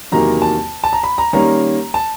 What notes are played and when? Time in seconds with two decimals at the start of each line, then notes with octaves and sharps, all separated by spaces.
0.12 E2 C3 D#3 F#3 A#3 A#5
0.42 A5
0.84 A5
0.93 A#5
1.03 B5
1.18 A#5
1.33 D#3 G3 A#3 C#4 A#5
1.94 A5